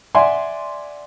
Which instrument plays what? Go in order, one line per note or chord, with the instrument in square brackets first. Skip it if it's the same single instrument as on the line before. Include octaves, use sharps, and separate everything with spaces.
[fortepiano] D5 E5 F#5 G#5 C6